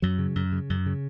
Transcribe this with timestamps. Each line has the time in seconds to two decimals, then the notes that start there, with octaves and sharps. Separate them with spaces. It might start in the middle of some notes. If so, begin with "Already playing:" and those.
0.02 F#2 F#3
0.19 C#3
0.35 F#2
0.52 C#3
0.70 F#2
0.86 C#3